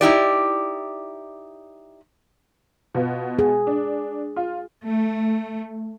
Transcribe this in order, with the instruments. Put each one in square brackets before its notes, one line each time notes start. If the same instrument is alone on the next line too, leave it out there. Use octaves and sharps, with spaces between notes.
[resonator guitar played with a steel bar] D#4 E4 G4 D5
[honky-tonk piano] B2 B3 F4
[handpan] G#4
[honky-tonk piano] D4
F4
[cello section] A3